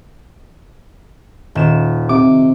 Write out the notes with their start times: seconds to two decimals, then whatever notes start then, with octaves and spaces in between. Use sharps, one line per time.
1.55 D#1 E7
2.09 C3 D6